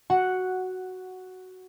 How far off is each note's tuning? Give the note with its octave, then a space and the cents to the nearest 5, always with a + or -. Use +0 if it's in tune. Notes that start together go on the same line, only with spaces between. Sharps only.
F#4 +5 F#5 +0